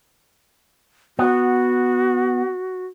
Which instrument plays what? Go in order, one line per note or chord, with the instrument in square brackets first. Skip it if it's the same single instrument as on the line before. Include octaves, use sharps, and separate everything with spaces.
[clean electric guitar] B3 [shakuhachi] F#4